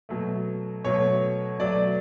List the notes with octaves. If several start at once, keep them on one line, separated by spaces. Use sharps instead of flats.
B2 F#3 A3
B2 F#3 A3 C#5
B2 F#3 A3 D5